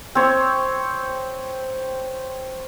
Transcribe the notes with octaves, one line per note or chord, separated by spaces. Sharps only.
C4 C#5